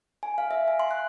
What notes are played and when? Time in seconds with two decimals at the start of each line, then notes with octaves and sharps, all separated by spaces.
0.23 G#5
0.38 F5
0.51 E5
0.68 G#5
0.80 C6
0.91 F#6